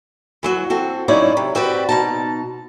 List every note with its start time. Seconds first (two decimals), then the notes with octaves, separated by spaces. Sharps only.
0.43 E3 F#3 F#4
0.70 C4 F#4 A4
1.08 F#3 C#4 D#4 E4 C#5 D5
1.37 C3
1.55 C4 F#4 G4 B4 D5
1.89 B2 D#4 A5